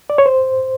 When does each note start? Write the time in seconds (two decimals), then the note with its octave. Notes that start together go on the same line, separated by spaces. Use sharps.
0.10 D5
0.18 C#5
0.26 C5